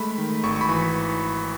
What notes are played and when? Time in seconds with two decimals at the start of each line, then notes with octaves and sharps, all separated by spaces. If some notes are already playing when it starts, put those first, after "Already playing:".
Already playing: G#3 A3 B5
0.18 D#3
0.43 G#1 C#6
0.56 C#6
0.61 B5
0.69 E3